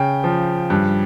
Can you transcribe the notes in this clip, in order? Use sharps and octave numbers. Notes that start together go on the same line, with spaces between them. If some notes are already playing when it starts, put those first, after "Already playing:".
Already playing: C#3 G5
F3
G2